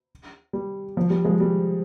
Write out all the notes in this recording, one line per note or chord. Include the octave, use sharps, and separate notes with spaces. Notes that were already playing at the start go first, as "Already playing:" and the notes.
G3
F3
G3
F3 G#3
G3